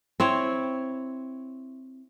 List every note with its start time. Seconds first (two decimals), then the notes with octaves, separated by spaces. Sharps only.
0.20 C4 E4 C#5